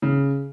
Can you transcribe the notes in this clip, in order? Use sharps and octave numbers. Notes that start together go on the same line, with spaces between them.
C#3